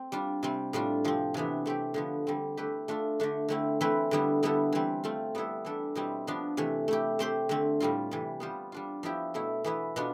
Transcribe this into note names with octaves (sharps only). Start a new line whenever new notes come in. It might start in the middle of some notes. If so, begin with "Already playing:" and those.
Already playing: C4
G3 D4 F4
C3 G3 C4
A2 G3 D4 F4
C3 F3 C4
C3 E3 B3 D4
A3 C4 G4
D3 F3 B3
D3 G3 C4
A3 E4 G4 B4
A3 D4 F4 A4
D3 A3 D4
D3 A3 C4 E4
E3 A3 C4 E4 B4
D3 G3 B3 E4
D3 G3 B3 E4 A4
E3 G3 C4
A3 C4 F4
G3 B3 E4 A4
E3 G3 D4 A4
B2 G3 C4 E4
F3 B3 D4 F4
C3 E3 A3
A3 E4 G4
A3 C4 G4 C5
D3 A3 C4
A2 G3 C4 F4
C3 E3 G3
G3 B3 F4 C5
G3 D4 F4
F3 B3 E4 G4
B2 A3 E4
E3 B3 E4 B4
B2 B3 D4 F4